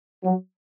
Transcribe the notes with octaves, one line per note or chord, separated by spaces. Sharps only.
F#3